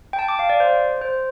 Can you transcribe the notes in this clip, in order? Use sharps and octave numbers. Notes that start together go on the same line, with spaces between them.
G5
A5
D6
F5
D5
C5
C5